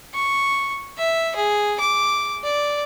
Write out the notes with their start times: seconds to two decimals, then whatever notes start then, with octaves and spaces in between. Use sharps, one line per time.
0.14 C#6
0.98 E5
1.36 G#4
1.80 D6
2.44 D5